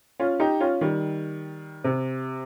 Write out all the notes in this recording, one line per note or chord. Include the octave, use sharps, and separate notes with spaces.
C#4 F4
D#4 G4
C#4 F4
D#3 G3
C3